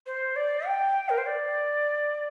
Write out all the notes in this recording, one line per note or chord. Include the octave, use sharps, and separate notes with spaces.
C5
D5
G5
A#4
C5
D5